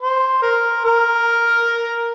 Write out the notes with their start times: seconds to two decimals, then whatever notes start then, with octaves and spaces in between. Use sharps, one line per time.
0.02 C5
0.42 A#4
0.85 A#4